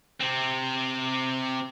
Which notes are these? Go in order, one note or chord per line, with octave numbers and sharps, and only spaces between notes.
C3 C4